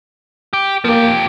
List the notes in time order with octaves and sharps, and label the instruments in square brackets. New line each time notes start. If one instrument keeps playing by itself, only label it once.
[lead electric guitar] G4
[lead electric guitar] F3 G4 [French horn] A#3